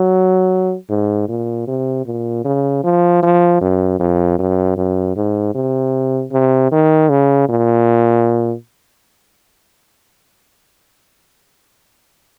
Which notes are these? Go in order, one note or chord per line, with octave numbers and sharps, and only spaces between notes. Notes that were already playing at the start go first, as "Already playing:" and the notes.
Already playing: F#3
G#2
A#2
C3
A#2
C#3
F3
F3
F#2
F2
F#2
F#2
G#2
C3
C3
D#3
C#3
A#2